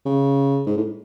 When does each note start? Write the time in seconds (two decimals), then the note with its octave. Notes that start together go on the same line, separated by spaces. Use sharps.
0.05 C#3
0.66 G#2
0.77 A2